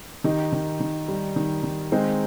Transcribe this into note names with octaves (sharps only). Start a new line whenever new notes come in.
D#3 D#4 G4
D#3
D#3
G3
D#3
D#3
G#3 C4 D#4